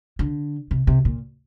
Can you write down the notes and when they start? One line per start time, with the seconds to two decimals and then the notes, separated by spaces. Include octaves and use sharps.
0.19 D3
0.71 C3
0.87 C3
1.05 A#2